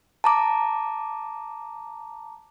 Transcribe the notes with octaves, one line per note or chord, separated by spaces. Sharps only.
A5 A#5 D6